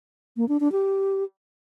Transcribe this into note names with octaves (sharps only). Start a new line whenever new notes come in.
A#3
D4
D4
G4